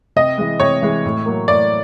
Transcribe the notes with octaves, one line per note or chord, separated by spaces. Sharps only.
C3 D#5
E3 G#3
C3 C#5
E3 G#3
A2
F#3 A#3
A2 D5